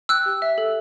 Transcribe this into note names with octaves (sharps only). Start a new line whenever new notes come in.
G5 E6 F#6
G4
E5
A4